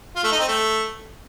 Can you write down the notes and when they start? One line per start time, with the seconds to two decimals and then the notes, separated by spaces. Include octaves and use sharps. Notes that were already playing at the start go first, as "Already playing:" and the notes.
0.16 F4
0.24 A3
0.32 D#4
0.40 C4
0.48 A3